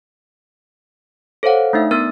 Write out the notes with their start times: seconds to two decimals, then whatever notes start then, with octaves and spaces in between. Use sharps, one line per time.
1.43 A4 C5 C#5 F5 F#5
1.73 A3 D4 D#4 E5
1.91 B3 A#4 F6 A6